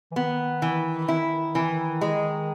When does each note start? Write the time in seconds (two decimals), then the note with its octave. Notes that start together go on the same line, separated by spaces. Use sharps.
0.11 E3
0.16 D#3 B3
0.62 E3
1.08 E4
1.55 E3
2.01 G#3